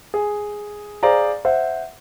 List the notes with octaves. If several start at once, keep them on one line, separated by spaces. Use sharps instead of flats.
G#4
G#4 C5 D5 F5 A#5
C5 E5 F#5